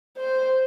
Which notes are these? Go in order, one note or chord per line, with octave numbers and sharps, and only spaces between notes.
C5